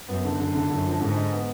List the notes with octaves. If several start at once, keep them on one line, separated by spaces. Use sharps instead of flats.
F#2 B3
D3
F#2 D3
D3
F#2 D3
F3
G#2 D3
D#4
B3